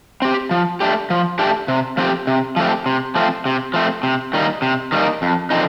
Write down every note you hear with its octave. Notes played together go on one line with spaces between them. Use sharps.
C4 G4
F3
A3 D4 G4
F3
A3 D4 G4
C3
F3 A3 C4 G4
C3
F3 A3 C4 G4
C3
F3 A3 C4
C3
F3 A3 C4
C3
D#3 G3 A#3 D#4
C3
D#3 G3 A#3 D#4
F2
D3 F3 C4 D#4